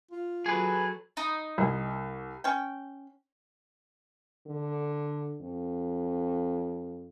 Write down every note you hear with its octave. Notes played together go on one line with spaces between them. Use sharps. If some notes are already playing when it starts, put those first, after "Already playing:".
F4
F#3 G#4 A4 B4
D#4
C2
C#4 G5
D3
F2